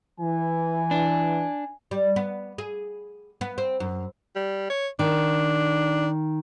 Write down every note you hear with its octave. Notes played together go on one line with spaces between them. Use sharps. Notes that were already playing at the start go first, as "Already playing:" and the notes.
E3 G#5
D4
G3
B3
G#4
B3
C4
F#2
G3
C#5
D#3 D4